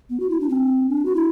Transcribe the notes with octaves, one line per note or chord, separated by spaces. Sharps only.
B3
F#4
E4
D4
C4
D4
F#4
E4